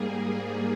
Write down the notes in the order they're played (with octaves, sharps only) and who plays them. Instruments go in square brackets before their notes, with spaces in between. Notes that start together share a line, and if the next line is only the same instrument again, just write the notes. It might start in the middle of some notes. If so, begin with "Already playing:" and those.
Already playing: [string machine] G#2 G3 A#3 G#4